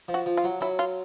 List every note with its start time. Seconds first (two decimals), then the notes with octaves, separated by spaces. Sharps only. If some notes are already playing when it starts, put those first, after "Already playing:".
0.08 F3
0.14 F#4
0.26 F3
0.37 F4
0.44 F#3
0.61 F#3 E4
0.79 F4